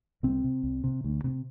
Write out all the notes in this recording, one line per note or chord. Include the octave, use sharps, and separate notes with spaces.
C2 C4
C3
C2
C3
D2
C3